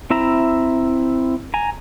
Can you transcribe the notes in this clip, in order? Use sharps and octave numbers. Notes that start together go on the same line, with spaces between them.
C4 E4 E5 A#5
G#5 A#5